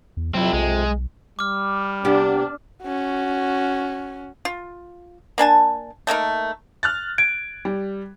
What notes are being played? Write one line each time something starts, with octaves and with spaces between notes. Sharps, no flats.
E2
F2 C3 F#3 C4 E4
B1 G#3
G3 D6 F6
C3 B3 D4 G4
C#4 F#4
F4
A#3 D4 G#5 A5
A3 A#3 D#4 A#4
F6 F#6 A6
G#6 D7
G3